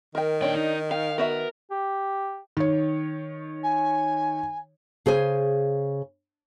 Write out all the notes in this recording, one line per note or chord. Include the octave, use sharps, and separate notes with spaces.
D#3 A#4 G5
A#2 D4 C#5 G5
D#4
D#4 F5 G5
B3 F#4 A#4 E5
G4
D#3 C#5
G#5
C#3 G#4 C5 G#5